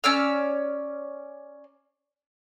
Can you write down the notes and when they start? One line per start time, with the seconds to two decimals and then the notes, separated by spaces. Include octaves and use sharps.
0.04 C#4 D5 E6 F6